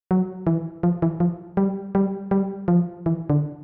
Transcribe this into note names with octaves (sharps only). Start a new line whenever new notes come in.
F#3
E3
F3
E3
F3
G3
G3
G3
F3
E3
D3